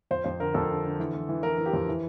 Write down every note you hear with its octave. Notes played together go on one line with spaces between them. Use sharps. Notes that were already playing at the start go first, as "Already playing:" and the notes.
F2 C5
F2 C5
D3 A#4
F2 A4
D3
D3
E3
E3
E3
E3 A#4
E3
G4
F2
E3